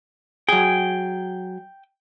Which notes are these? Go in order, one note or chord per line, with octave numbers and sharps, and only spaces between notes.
F#3 G#4 G5